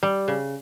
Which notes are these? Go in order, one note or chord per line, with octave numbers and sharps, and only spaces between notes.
G3
C#3